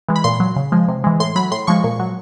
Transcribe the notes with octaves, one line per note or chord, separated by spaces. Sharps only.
E3 G#3
B5
A#2 C6
F#3
C#3
F3 G#3
C3
E3 G#3
A2 C6
F#3 B5
A2 C6
F3 G#3 C#6
A#2
F#3